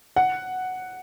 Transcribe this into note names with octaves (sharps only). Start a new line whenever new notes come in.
F#5